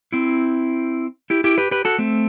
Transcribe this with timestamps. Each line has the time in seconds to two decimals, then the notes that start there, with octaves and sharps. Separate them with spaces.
0.12 C4 E4
1.30 E4 G4
1.44 E4 G4
1.58 G4 B4
1.71 G4 B4
1.85 F#4 A4
1.99 A3 C4